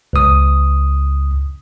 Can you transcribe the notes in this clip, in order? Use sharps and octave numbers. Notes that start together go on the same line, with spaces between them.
C#2 D#6